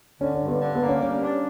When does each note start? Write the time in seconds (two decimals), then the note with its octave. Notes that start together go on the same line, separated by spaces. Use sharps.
0.21 D3 C#4
0.34 C#4
0.41 G2
0.48 B3
0.61 D3
0.75 B3
0.81 A#3
0.89 C#4
1.01 G3 C#4
1.22 D4